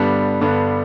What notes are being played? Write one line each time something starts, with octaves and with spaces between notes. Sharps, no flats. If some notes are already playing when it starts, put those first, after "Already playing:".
Already playing: G2 D3 G3 B3 D4
G2 D3 G3 B3 D4